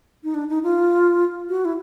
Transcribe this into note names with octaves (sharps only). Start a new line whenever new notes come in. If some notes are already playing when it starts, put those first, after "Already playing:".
D#4
D4
D#4
F4
F#4
E4